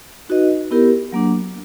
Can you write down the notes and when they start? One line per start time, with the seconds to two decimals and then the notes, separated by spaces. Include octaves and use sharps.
0.29 D#4 F#4 B4 D#5
0.71 B3 E4 G4 A#4
1.12 F#3 A#3 D4